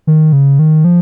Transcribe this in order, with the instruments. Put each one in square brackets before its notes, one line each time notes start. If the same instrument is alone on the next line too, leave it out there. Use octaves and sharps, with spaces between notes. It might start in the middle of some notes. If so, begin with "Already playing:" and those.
[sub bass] D#3
C#3
D#3
F3